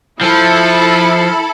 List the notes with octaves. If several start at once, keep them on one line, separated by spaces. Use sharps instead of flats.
F3 E4 A4 B5